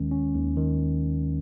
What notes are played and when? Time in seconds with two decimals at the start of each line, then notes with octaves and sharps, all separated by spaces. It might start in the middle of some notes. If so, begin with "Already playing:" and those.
Already playing: D#2 D#3 G#3 C#4
0.11 C#4
0.34 D#2
0.57 D#3